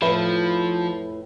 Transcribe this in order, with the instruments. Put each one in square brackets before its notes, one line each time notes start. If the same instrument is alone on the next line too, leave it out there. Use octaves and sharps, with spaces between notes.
[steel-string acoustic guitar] F2 A2 [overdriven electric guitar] F3 [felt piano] B4 E5 B5